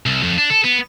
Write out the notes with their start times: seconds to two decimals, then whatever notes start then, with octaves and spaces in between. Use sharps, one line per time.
0.06 C2
0.23 F2
0.38 D4
0.50 A4
0.64 B3